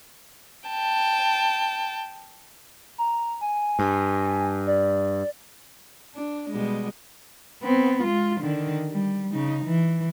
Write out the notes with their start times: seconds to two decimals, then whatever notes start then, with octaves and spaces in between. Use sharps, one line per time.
0.69 G5 A5
2.98 A#5
3.41 G#5
3.79 G2
4.67 D5
6.15 D4
6.50 B2 G3 G#3
7.63 B3 C4
8.03 G#3 F4
8.41 D3 D#3
8.92 G3
9.34 C#3 D#4
9.65 E3